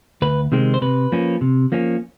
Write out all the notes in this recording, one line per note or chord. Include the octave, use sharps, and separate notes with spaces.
D2 B4
C3 D#3 G#3 C4
C5
C3 B4
F3 A#3 C#4
C3
F3 A#3 C#4